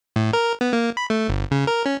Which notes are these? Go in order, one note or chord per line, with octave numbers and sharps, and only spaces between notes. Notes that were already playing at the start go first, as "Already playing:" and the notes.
A2
A#4
B3
A#3
B5
A3
G1
C#3
A#4
C#4